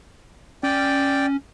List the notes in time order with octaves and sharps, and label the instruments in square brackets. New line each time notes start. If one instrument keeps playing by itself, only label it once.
[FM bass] C#4 [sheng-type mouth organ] D5 G5